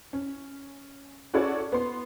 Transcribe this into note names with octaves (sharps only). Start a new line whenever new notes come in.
C#4
C#4 F#4 G#4 A4 C#5 D5
B3 C6